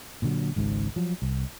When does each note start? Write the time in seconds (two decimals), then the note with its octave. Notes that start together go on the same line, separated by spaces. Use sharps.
0.22 A#2 D3 F#3
0.56 G#1 C#2 G#2
0.96 F3 F#3
1.22 C2